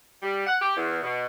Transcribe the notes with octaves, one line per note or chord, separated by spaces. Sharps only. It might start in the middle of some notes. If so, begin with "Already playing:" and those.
G3
F#5
G4
E2
B2